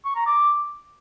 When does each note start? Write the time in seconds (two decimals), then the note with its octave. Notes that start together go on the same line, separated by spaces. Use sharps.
0.05 C#6
0.16 A#5
0.26 D6